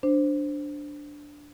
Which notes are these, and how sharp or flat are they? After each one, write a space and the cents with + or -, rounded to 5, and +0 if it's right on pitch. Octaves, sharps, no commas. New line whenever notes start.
D4 +0 C5 +0